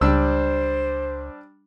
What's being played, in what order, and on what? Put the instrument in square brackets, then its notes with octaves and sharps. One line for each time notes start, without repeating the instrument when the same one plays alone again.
[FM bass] C#2 [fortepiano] G3 D4 E6 [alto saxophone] C5